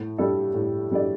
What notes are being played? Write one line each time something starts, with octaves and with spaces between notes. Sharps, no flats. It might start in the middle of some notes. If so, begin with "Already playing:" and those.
Already playing: A2
G3 D4 A4 D5
A2
G3 D4 A4 D5